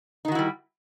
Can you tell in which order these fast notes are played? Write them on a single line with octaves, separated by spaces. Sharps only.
D#4 D#3 F#4 E4 G3